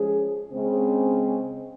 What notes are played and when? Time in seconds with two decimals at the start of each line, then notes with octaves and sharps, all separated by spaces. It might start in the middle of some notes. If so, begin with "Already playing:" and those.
Already playing: F3 G#3 C#4 G#4
0.52 C#3 G#3 C4